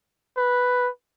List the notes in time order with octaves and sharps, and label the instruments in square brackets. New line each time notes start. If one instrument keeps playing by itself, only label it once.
[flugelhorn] B4